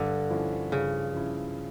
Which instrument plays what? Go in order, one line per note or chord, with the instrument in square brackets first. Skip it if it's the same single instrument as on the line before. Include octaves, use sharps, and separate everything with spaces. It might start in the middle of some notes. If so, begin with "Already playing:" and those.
Already playing: [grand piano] G2 [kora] D3
[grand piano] F3 C#4 E4
[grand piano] G2 [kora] C#3
[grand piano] F3 C#4 E4